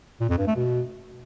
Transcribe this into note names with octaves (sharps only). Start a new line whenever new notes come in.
A#2
F2
G2
A3
B2